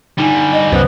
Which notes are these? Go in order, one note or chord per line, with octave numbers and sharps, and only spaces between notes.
D3 G3 D#4 G#5
D#5
C2 F#2 B3 C5